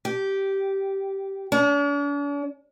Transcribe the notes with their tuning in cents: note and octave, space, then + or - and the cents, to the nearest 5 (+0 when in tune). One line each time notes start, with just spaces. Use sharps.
G4 -10
D4 -45